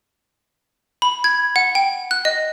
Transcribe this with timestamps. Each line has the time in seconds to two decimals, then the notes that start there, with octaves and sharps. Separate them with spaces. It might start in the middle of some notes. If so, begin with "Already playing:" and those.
1.02 B5
1.24 G#6
1.56 F#5
1.75 G5
2.11 F#6
2.25 D#5